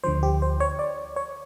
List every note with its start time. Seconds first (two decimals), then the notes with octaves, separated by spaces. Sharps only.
0.04 D2 D3 F3 C5
0.23 G4
0.42 C5
0.60 C#5
0.79 D5
1.16 C#5